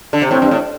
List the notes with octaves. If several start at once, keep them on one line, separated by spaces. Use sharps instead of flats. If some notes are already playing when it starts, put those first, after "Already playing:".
D3
C3
A2 C4
G2
A2